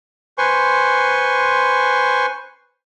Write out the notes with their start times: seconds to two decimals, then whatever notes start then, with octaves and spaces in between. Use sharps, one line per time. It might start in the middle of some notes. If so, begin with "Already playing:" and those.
0.38 B4 C5 G#5 C6 C#6